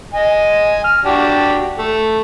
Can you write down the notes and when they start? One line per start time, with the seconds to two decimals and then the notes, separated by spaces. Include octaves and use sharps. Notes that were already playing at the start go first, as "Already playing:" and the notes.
0.13 D#5 G#5
0.84 F6
1.05 D4 F#4 G4
1.78 A3